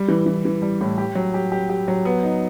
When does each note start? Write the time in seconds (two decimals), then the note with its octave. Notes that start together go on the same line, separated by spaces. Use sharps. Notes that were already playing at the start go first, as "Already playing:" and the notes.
Already playing: G3
0.08 E3
0.26 E3
0.45 E3
0.62 G3
0.81 A2
0.98 G4
1.15 F#3
1.34 G4
1.52 G4
1.70 G4
1.88 F#3
2.05 B3
2.23 D#4